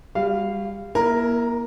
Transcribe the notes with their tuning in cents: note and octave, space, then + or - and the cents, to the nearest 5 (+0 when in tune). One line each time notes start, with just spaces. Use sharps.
G3 +30 F#4 +0 F5 -15
A#3 +40 E4 +0 A#4 +0